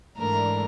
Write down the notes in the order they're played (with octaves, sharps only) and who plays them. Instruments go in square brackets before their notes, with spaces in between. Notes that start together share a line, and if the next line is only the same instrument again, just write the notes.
[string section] G#2 E3 A3 D4 [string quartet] A#4